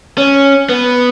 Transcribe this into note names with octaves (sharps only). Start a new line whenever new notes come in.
C#4
B3